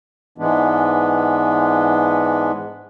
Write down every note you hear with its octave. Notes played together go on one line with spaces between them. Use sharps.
G#2 E3 G#3 B3 D4